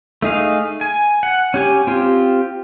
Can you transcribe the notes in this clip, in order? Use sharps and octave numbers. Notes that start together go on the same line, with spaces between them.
A3 D#4 G#4 F5
G#5
F#5
C#4 G4 G#5
C4 F4 G4